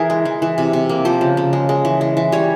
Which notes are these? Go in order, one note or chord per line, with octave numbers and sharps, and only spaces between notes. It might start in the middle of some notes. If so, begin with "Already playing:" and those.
Already playing: E3 G#4 A#4
G#3
E3
E3
C3
C3
A#3
F3 C5
C#3
C#3
G#3
G#3
E3
G#3
E3
G3 C#5